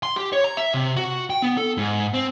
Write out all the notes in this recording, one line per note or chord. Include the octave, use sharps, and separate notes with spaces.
C6
G4
C#5
A#5
E5
C3
F#4
G5
B3
A4
G#2
C4